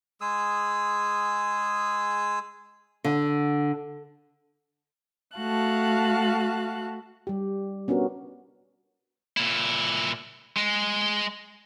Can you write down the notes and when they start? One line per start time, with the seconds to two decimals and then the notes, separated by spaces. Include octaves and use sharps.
0.21 G#3 G#4 D#6 E6
3.04 D3
5.37 A3 F#4 F5 A5 F#6
7.27 G3 G4
7.88 B3 C#4 D4 F#4 A#4
9.37 A#2 E4
10.57 G#3